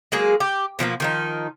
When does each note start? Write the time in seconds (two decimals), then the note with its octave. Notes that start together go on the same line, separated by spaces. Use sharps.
0.12 F#3 G#3 A#3 G#4
0.40 G4
0.79 B2 F3 A3 A#3
1.00 D#3 F3 D#4